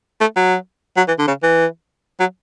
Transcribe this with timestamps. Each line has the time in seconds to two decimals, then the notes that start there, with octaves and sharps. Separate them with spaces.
0.21 A3
0.36 F#3
0.97 F#3
1.08 E3
1.18 D3
1.28 C#3
1.43 E3
2.20 F#3